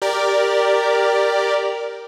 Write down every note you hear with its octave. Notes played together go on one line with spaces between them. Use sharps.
G4 A#4 D5